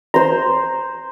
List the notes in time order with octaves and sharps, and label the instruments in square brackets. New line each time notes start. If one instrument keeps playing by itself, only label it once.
[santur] C5 C6 [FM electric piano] A#5